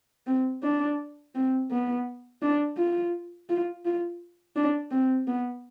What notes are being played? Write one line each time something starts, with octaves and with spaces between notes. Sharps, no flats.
C4
D4
C4
B3
D4
F4
F4
F4
D4
C4
B3